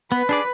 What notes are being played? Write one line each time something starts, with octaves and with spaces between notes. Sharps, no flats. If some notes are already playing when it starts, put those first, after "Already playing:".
B3 B4
D4 G#4 D5